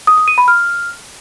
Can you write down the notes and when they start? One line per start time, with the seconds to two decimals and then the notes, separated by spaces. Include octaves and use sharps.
0.07 D#6
0.17 D#6
0.28 D#7
0.38 B5
0.48 F6